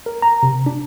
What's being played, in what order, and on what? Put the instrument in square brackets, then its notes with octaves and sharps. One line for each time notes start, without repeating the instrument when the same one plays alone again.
[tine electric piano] A#4
A#5
C3
D4